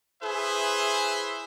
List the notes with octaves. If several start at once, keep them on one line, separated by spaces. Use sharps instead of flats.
E4 G#4 B4 C5 E5